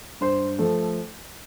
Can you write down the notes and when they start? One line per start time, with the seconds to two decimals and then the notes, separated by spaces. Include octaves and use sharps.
0.21 G2 C5
0.58 F3 A3 A4